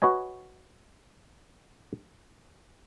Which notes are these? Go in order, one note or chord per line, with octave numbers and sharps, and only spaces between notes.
F#4 B4 C#5 D#5 G#5